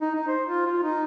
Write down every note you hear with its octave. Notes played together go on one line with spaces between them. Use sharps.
D#4
D#4
C5
F4
F4
D#4